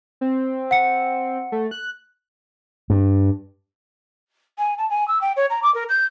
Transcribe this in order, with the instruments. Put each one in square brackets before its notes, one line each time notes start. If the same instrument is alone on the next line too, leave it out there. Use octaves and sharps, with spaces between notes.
[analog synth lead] C4
[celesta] F#5 C#7
[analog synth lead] A3
F#6
[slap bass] G2
[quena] G#5
A5
G#5
E6
G5
C#5
A#5
D6
A#4
G6